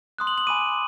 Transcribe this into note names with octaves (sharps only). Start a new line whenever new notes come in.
C6 D#6 F#6
F#7
F#7
G#5 B5 D6 D#7